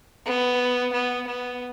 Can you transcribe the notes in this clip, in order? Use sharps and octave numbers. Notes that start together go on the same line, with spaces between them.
B3
B3
B3